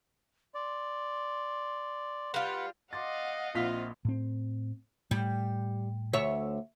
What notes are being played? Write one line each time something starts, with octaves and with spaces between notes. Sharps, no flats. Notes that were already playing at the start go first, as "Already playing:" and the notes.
D5 C6
G3 F4 B4 F#5
D#5 F5 F#5 C6 D6 A6
A#1 A#2 C4 E4 F4 B6
A2 C4
A2 G3
D2 C#5 E5